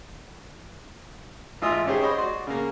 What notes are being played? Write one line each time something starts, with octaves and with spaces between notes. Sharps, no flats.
A1 G#2 F4 D#5 E5 D#6
C#4 D#4 G4 G#4 C5
C5 C#5 D#5 B5
F#4 D5 C6
C#3 A#3